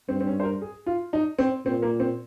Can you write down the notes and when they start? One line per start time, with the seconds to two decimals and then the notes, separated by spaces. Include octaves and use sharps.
0.09 G2 C4
0.21 C4
0.27 C#4
0.40 C5
0.43 A#4
0.62 G#4
0.86 F4
1.13 D#4
1.39 C4
1.65 A#2 C4
1.82 A#3
2.00 C4